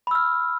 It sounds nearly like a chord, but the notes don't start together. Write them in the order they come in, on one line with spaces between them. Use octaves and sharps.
B5 E6 F6